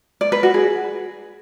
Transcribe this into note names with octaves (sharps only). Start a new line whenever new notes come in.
D5
B4
F#4
G#4